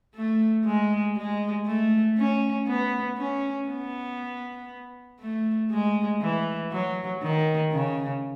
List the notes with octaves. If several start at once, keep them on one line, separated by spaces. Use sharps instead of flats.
A3
G#3
G#3
A3
C#4
B3
C#4
B3
A3
G#3
E3
F#3
D#3
C#3